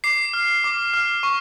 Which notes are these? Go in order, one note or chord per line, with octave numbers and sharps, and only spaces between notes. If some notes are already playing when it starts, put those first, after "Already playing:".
D6 C7
F6
D6
F6
C#6